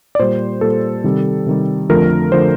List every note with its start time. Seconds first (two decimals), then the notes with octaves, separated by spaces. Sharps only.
0.15 D5
0.19 A#2 G3 C5
0.61 A#2 G3 A4
1.04 C3 D#3 G3
1.46 C3 D#3 G3
1.89 F2 D3 F3 A3 A#4
2.32 D3 F3 A3 C5